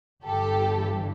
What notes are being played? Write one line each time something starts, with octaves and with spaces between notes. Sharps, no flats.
G1 G2 E3 G4 A4